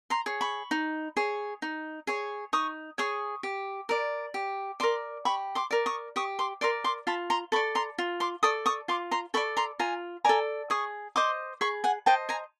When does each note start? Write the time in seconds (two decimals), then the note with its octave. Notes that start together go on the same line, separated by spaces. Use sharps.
0.10 A#5 C6
0.26 G#4 C#5
0.41 B5 C#6
0.71 D#4
1.17 G#4 C#5
1.62 D#4
2.07 G#4 C#5
2.53 D#4 C#6 D#6
2.98 G#4 C#5 C#6 D#6
3.43 G4
3.89 A#4 D5
4.34 G4
4.80 A#4 D5 C6 D6
5.25 G4 B5 C#6
5.55 C6 D6
5.71 A#4 D5
5.86 C#6 D#6
6.16 G4 C#6 D#6
6.39 C6 D6
6.61 A#4 D5 C6 D6
6.84 C6 D6
7.07 F4 A5 B5
7.30 A#5 C6
7.52 A4 B5 C#6
7.56 D5
7.75 A#5 C6
7.98 F4
8.20 C6 D6
8.43 A4 D5 C#6 D#6
8.66 C#6 D#6
8.88 F4 C6 D6
9.11 A#5 C6
9.34 A4 D5 B5 C#6
9.57 A#5 C6
9.79 F4 G#5 A#5
10.25 A4 D5 G#5 A#5
10.70 G#4 C#6 D#6
11.16 C5 D#5 C6 D6
11.61 G#4 B5 C#6
11.84 F#5 G#5
12.06 C5 D#5 G5 A5
12.29 G#5 A#5